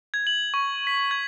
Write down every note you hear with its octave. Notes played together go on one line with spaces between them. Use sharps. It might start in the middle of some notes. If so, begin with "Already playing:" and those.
G#6
F#7
C#6
B6
G#6